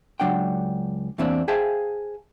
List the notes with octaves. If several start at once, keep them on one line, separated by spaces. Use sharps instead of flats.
C#2 B2 F#3 D4 F#5 G5
E2 E3 A#3 C4 D4
G#4 C5 E5 F5 G5 A5